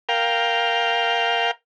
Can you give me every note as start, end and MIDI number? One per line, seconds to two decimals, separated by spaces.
0.09 1.51 70
0.09 1.51 77
0.09 1.51 79